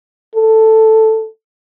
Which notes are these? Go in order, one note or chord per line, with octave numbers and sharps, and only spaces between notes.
A4